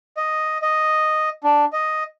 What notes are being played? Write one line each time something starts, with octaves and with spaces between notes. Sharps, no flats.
D#5
D#5
D4
D#5